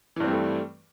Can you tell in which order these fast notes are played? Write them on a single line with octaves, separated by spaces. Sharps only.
E3 G2 C4 G3 A3